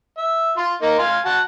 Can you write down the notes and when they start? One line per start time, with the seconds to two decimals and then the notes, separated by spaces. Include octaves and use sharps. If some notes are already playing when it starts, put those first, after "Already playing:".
0.18 E5
0.57 F4 C6
0.82 A#3 D#4
0.99 F5 G#5 C6
1.26 F#4 F#5 A5